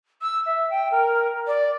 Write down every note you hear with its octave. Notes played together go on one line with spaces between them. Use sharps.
E6
E5
G5
A#4
D5